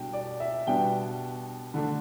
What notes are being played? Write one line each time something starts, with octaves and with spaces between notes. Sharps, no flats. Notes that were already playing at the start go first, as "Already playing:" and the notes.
Already playing: B2 G3 D4 G5
D5
E5
B2 G3 B3 D4 G5
D3 A3 D4